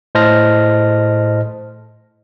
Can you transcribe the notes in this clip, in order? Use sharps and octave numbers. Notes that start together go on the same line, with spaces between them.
A2 C5 D#5 A5 F6 A#6